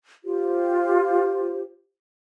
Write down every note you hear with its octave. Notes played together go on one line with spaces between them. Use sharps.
F4 G4 C5